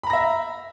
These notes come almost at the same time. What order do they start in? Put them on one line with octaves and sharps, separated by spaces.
B5 A#5 A#6 E5